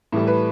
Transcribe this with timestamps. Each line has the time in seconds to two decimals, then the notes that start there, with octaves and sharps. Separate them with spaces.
0.12 A2 E3 G3 A4
0.27 B4